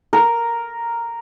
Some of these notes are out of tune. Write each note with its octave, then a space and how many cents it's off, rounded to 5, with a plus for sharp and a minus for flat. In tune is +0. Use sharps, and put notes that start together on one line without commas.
A#4 +0